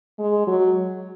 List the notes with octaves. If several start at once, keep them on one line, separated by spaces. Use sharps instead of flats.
G#3
F#3